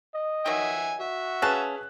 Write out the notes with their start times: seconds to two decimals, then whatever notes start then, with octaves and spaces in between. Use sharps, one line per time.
0.14 D#5
0.46 D#3 F#3 E5 G#5
1.00 F#4 E5
1.42 C#4 G#4 B4 F5 A5 F#6